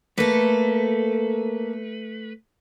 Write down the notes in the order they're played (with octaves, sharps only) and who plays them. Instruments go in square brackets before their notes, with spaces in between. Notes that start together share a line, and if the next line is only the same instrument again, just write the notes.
[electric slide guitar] A3 B4 [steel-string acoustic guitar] A#3 A4